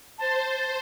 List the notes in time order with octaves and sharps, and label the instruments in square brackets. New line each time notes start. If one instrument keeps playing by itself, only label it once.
[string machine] C5 [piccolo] A5